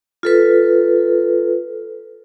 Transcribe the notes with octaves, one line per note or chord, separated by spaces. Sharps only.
F4 A4 B4